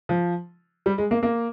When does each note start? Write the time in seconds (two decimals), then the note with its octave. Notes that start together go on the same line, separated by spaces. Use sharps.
0.09 F3
0.86 G3
0.98 G#3
1.11 A#3
1.23 A#3